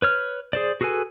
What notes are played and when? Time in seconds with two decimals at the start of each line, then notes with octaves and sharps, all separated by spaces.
0.02 B4 C#5 F6
0.53 G#4 C5 D5
0.81 F#4 G#4 A4 B4 G#5